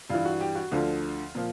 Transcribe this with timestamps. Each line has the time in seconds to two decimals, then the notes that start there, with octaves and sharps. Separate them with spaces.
0.09 G2 E3 F4
0.25 F#4
0.40 G4
0.55 F#4
0.71 D2 D3 F3 F4
1.35 A#2 F3